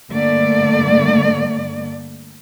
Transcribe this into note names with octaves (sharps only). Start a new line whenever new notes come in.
G2 D3 A3 A#3 D5